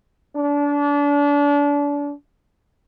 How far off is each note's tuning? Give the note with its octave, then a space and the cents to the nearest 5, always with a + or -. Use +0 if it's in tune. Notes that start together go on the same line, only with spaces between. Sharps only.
D4 -30